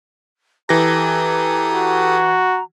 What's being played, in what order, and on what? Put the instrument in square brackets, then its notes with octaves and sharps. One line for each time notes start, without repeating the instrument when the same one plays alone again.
[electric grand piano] E3 A#6 [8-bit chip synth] G4 A4 D#6 [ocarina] A#5
[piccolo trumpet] F#4